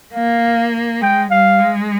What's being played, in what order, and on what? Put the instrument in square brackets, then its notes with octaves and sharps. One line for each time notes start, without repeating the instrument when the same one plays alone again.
[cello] A#3 [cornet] F5
[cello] G#3 [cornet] G5
[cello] G3 [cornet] F5
[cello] G#3